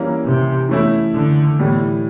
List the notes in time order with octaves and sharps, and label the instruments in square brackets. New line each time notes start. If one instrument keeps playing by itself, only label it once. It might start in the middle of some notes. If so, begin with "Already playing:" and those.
Already playing: [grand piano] E3 G3 A#3 C#4
[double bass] C3
[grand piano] E3 A3 C#4 E4
[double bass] D3
[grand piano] A2 E3 G3